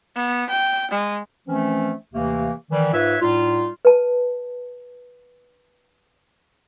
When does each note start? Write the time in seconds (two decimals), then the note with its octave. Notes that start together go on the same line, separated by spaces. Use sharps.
0.15 B3
0.50 G5
0.91 G#3
1.48 E3 F3 A3 C4 C#4
2.14 D#2 C3 E3 A3 A#3
2.71 D#3 E3 G3
2.93 G#2 F4 B4 C#5 E5
3.22 A2 G3 D#4 F4
3.85 B4 A5